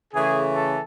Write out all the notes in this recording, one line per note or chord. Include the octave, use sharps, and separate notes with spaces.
C#3 E3 A3 G#4
A4